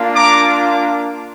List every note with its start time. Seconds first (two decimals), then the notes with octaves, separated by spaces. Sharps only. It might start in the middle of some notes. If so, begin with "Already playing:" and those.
Already playing: A#3 D4 F4
0.15 A#5 D6